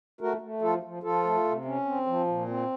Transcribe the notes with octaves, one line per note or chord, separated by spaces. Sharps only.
A3 F#4 A#4
A3
F3 F4 A4
F3
F3 F4 A4
A3
C3
C#4
C4
F3
A#2
C4